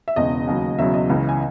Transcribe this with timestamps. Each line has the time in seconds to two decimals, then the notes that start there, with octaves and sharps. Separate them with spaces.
0.08 E5
0.16 E1 E2 C#3 D#5
0.47 D#2 C#3 F#3
0.78 E1 E2 C#3 F#3 E5
0.94 D#5
1.09 C#2 C#3 E3
1.29 G#5